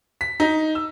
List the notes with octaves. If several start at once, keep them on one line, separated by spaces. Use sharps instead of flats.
B6
D#4
E6